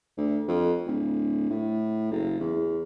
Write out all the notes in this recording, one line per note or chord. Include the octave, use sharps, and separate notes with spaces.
D2
F2
D1
A2
F#1
E2